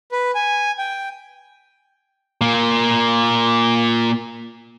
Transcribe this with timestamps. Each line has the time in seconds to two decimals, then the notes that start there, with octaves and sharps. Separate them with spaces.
0.12 B4
0.35 G#5
0.78 G5
2.41 A#2 A#3